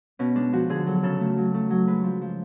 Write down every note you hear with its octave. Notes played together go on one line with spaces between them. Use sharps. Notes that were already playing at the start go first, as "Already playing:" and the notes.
B2 C#4
G#3 D4
F3 F#4
D3 G#4
F#3 A4
C#3 A4
A3
F#3
A3
F#3
G#3 B4
F3
F3